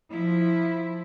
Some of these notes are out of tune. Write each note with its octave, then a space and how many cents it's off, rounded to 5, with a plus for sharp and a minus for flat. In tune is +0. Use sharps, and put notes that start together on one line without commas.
F3 +0 E4 +0